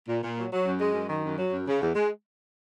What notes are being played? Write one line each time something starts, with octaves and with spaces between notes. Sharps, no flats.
A#2
A#2
F#3
F#3
F#2
G#3
F#2
D#3
F#2
F#3
F#2
C#3
E2
G#3